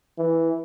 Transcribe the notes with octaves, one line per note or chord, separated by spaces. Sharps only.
E3